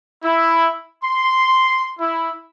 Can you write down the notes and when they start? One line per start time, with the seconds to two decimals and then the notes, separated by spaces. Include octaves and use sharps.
0.24 E4
1.04 C6
2.00 E4